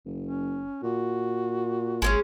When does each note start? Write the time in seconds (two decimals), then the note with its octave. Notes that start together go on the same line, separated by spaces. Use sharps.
0.05 F#1
0.27 C#4
0.83 A#2 F#4
2.02 G#1 G#3 A#3 C#4